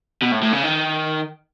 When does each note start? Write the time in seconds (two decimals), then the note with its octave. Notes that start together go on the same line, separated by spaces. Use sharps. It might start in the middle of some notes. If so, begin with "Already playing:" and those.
0.23 B2
0.32 A2
0.43 A2
0.53 C#3
0.63 D#3